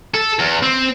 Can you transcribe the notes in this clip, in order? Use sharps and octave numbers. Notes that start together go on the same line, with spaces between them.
A4
E2
C4